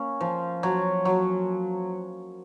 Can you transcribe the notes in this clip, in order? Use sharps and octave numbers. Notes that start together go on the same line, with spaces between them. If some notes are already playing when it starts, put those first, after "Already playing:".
Already playing: A#3 C#4
F3
F#3
F#3